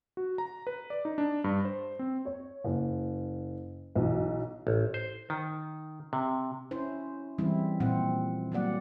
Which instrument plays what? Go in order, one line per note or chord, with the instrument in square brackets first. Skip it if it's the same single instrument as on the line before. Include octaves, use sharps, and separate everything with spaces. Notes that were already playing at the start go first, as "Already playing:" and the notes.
[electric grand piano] F#4
A#5
B4
D5
D#4
D4
G2
C5
C4
[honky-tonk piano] C#5
F#1
B1 E3
[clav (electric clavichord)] A1
C5
D#3
C3
[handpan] C#4 E4 C5
E3 G3 G#3 C4 E4
A#2 F3 C4 F#5
F#3 G3 A#3 B3 D5 F#5